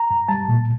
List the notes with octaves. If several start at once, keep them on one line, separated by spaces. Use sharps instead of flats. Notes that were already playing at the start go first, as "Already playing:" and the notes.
Already playing: A#5
G2
G3 A5
A#2